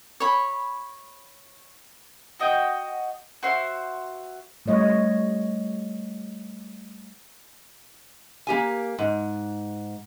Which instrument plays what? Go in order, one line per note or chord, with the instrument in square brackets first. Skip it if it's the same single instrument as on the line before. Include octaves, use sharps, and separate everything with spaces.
[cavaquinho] C#5 B5
[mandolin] F#4 D#5 G5
F#4 C5 E5 C6
[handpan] G3 A3 C#5 D#5
[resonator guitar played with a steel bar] A#3 G4 G#5
G#2